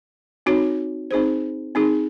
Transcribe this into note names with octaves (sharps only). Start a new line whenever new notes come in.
C4 D#4 F#4 C#5
C4 D#4 G#4 C5
C4 D#4 G#4